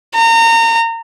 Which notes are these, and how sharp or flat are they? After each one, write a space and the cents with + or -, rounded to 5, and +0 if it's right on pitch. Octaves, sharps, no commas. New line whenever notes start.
A#5 -30